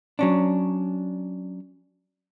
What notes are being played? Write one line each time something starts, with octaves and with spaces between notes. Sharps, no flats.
F#3 C#4 D4